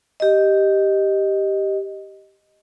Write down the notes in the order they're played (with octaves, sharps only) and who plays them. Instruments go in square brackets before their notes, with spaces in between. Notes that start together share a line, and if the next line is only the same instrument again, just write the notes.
[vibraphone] G4 D#5